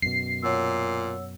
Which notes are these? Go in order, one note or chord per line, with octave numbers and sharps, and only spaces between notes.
F#2 B2 C7
A#2 C#5 F#5 E6